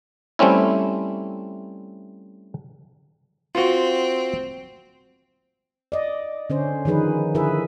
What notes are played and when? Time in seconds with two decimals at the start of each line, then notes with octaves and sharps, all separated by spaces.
0.39 G3 A3 C4 C#4 E4
3.55 C4 F4 F#4
5.92 D5 D#5
6.50 D3 C#4 C5
6.85 D#3 F3 D#4 G#4 B4
7.35 D3 E4 G#4 A#4 B4 E5